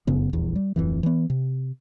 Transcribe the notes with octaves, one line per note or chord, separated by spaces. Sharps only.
F1 F#2 C#3 B3
D#1 A#1 E2
G3
D1 F2 E3
E3 B3
C3